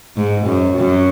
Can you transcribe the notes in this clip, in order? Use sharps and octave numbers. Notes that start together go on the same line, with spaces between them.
G#2
F#2
F#2